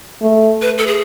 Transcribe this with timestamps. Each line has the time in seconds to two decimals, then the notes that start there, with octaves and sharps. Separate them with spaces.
0.22 A3
0.62 B4
0.78 A4
0.87 G#4